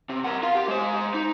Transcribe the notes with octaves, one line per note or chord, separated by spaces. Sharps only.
C3
A#4 F#5
F4 F5
G4
G#3 C5
D#4